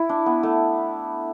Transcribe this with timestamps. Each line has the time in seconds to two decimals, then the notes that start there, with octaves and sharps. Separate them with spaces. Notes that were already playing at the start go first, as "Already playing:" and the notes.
Already playing: E4
0.09 D4
0.26 B3
0.43 A3